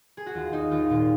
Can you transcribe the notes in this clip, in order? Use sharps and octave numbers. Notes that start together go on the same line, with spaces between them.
G#4
F#4
D#2 F4
D#2 D#4
D#2 F4
A#2 F4